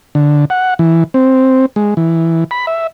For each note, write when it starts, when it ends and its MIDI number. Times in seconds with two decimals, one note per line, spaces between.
0.15 0.45 50
0.50 0.74 78
0.79 1.04 52
1.14 1.66 60
1.76 1.94 56
1.97 2.44 52
2.51 2.66 83
2.67 2.87 76